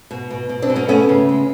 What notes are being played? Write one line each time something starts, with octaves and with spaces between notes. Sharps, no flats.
B2
B2
B2
C4 D4
B2
B3 C#4
A3 B3 C#4
C#3
G#3